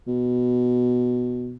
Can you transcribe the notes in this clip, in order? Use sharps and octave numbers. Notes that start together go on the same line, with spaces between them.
B2